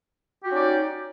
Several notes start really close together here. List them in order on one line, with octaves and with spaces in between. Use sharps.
G4 F#4 D#4 C#4 D5